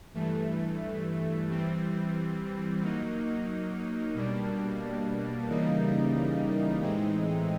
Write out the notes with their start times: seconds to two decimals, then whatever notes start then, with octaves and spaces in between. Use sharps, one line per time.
0.14 G2 E3 A3
1.48 E3 G3 C4
2.80 F#3 A#3 D#4
4.14 B2 G3 A#3 D4
5.47 C#3 E3 G3 A#3 D#4
6.81 A2 E3 G#3 C4 D#4